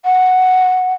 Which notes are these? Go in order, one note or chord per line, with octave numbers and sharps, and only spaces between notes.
F#5